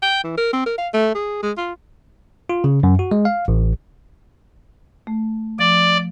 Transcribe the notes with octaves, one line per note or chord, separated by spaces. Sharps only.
G5
E3
A#4
C4
A#4
F5
A3
G#4
G#3
F4
F4
C#3
F#2
F#4
G#3
F5
A1
A3
F3 D5